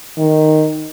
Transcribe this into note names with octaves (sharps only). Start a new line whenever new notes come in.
D#3